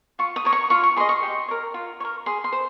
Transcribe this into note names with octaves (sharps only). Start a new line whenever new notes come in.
F4 C#6
D#6
A#4 C#5
C#6
F4 C#6
C#6
G#4 D#5 C6
C#6
G4
A#4 C#5
F4
C#5
A#4
G#4 C6
C6
C5